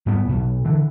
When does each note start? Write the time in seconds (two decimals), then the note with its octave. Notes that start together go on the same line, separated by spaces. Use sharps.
0.06 G#2 G3 B3
0.29 B1 B2
0.65 D3 E3